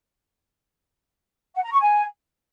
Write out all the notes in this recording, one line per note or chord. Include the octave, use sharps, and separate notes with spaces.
F#5
A#5
C#6
G#5